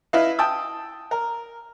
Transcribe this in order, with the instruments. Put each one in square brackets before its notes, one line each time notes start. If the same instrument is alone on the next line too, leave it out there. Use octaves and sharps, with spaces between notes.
[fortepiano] E4 B4 D#5 F5
G5 A5 D#6 E6
A#4